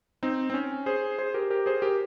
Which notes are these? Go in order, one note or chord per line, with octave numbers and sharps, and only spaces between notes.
C4 D#4
C4
C#4
G#4 C5
G#4 C5
G4 A#4
G4 A#4
G#4 C5
G4 A#4